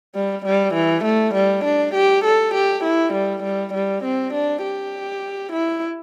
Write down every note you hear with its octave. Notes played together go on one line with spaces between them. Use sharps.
G3
G3
E3
A3
G3
D4
G4
A4
G4
E4
G3
G3
G3
C4
D4
G4
E4